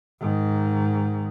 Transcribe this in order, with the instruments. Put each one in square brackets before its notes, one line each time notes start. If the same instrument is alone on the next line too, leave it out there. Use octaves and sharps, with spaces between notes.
[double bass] G#2 D#3